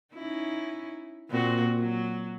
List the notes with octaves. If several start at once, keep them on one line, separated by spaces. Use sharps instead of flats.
C#4 D#4 E4
A#2 C4 F#4
F#3